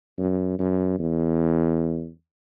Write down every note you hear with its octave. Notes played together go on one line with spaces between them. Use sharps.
F#2
F#2
E2